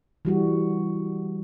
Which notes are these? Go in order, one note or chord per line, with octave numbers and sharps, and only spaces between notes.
E3 G3 F#4